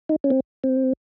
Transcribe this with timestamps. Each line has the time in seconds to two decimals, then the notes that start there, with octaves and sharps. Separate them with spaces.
0.09 D#4
0.24 C#4
0.30 C4
0.64 C4